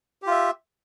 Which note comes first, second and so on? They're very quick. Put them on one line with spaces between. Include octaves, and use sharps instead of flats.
G4 F4 E5